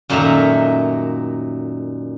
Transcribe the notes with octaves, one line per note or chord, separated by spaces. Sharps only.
F#2 A#2 D#3 A3 E5 A#5